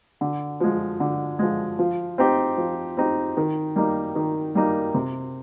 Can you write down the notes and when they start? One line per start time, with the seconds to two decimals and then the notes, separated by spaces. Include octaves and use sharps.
0.21 D3
0.60 F3 G#3
1.00 D3
1.39 F3 G#3
1.79 F3
2.18 C4 D#4 G4
2.57 F3
2.97 C4 D#4 G4
3.37 D#3
3.76 G3 A#3 D#4
4.15 D#3
4.55 G3 A#3 D#4
4.94 C3